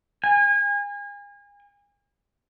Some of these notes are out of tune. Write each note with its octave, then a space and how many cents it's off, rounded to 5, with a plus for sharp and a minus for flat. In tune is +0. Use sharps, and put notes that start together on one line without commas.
G#5 -35